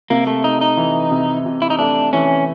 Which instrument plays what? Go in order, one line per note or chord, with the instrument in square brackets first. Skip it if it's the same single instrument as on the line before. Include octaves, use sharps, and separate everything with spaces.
[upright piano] C3 [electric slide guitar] A#3
[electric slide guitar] A3
[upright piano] A3 [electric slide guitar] D#4
[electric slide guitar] D#4
[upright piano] E3
C3
C3
[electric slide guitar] E4
D#4
[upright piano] A3 [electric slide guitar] D4
[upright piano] E3 [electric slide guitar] C#4